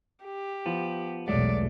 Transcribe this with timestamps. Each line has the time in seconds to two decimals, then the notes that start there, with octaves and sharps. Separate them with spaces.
0.25 G4
0.66 F3 B3
1.28 B1 E2 B2 F#3 G#3 A3 D5